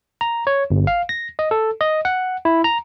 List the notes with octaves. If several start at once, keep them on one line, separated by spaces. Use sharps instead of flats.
A#5
C#5
G1
F5
A#6
D#5
A4
D#5
F#5
E4
A#5